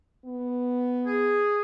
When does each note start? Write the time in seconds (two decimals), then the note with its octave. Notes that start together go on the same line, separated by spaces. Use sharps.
0.25 B3
1.07 G#4